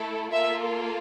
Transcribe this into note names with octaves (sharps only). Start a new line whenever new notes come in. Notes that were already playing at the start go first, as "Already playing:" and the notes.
Already playing: A3 E4 A4
A#3 F4 A4 E5